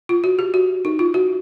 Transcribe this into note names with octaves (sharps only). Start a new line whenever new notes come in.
F4
F#4
G4
F#4
D#4
F4
F#4